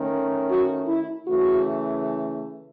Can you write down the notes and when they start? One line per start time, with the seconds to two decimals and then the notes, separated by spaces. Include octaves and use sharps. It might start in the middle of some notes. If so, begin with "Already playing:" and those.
Already playing: D#3 A3 C#4
0.47 F#4
0.86 E4
1.25 C#3 E3 A3 F#4